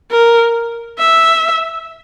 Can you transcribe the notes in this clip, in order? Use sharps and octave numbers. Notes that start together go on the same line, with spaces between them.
A#4
E5